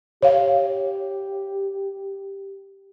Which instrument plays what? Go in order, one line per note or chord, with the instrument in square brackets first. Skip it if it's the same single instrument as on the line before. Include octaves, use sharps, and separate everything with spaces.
[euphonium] G4 [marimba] C#5 F5